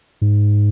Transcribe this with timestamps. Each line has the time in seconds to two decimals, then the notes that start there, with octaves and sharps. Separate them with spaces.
0.22 G#2